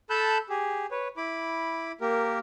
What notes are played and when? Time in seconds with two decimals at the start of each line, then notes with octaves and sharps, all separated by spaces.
0.10 A4 A5 B5 E6 F#6 G6
0.49 G4 G#4
0.91 B4 C#5
1.17 E4 B5 D6
2.01 A#3 G4 A#4